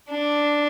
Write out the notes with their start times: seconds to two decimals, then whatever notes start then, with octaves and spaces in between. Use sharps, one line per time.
0.11 D4